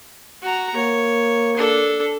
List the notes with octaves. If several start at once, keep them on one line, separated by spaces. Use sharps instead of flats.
F#4 A#5
A#3 C#5
D4 A4